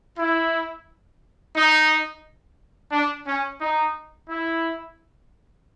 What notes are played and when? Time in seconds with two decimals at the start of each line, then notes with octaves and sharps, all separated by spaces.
0.18 E4
1.55 D#4
2.92 D4
3.26 C#4
3.60 D#4
4.29 E4